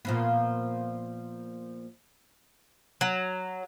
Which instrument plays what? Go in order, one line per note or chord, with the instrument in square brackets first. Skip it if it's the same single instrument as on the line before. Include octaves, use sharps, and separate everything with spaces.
[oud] A#2 F3 B3
[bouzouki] F#3